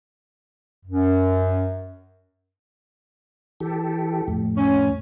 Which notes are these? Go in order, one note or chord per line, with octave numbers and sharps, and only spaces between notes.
F#2
E3 G4 A4
F2 A2
C#4